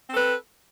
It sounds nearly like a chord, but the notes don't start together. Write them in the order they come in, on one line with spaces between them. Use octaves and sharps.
C4 A4 B4